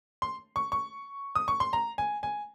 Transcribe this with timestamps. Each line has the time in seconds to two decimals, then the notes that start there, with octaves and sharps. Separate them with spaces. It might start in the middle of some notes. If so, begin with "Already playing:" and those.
0.22 C6
0.56 C#6
0.72 C#6
1.36 D#6
1.48 C#6
1.60 C6
1.73 A#5
1.98 G#5
2.23 G#5